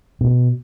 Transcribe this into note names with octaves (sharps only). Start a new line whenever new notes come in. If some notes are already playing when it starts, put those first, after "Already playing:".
B2